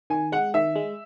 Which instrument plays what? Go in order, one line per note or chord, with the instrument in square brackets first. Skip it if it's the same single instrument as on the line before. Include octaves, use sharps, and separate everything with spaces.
[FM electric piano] D#3 [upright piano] G#5
[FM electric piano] G#3 [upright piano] F#5
[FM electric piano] D#3 [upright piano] E5
[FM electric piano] G#3